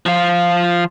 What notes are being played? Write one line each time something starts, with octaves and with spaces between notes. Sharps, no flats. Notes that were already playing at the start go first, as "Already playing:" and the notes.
F3 F4